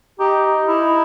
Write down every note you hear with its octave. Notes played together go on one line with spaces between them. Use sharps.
D#4 G4
E4